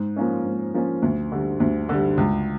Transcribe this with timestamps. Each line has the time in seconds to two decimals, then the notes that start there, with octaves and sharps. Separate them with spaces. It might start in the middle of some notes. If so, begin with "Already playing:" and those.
Already playing: G#2
0.16 F3 A#3 C#4
0.45 G#2
0.74 F3 A#3 C#4
1.02 D2
1.32 D3 G3
1.60 D2
1.89 D3 G3
2.17 C#2